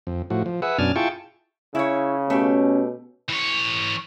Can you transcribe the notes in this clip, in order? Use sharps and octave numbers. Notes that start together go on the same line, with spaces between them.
F2
A2 F3 F#4
F3
G#4 B4 E5 F#5
F#2 B2 D4 G#5 A5 F6
E4 F4 G#4 G5 A5 C#6
C#3 E4 C#5
B2 A3 C#4 G4
E3 C#5